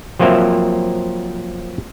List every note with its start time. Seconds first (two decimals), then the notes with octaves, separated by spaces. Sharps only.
0.19 F3 F#3 A#3 C4 A#4 E5